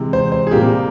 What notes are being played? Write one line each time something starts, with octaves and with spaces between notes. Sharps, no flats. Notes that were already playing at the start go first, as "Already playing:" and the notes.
Already playing: C3 E3 G#3
C5
C5
G#4
C3 G3 A#3 G4